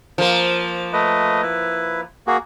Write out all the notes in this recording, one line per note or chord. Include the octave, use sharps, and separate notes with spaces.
F3 A#3
A3 B4 D#5
E4 B4
A#3 F#4 G#4